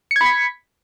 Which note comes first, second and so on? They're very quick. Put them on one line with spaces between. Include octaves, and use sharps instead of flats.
C#7 G#6 B5 B6